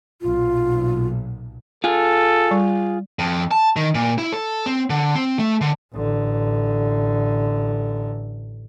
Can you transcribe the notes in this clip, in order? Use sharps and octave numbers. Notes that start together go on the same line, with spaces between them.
B1 A#2 F4
F4 G#4 A4
G3
F2
A5
D#3
A#2
E4
A4
C4
D3
C4
A3
D3
A1 D3